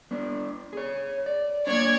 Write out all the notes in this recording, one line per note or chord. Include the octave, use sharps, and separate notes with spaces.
B3 D4
G#4 C#5
D5
A#3 B3 D4 C#5 D5 G#6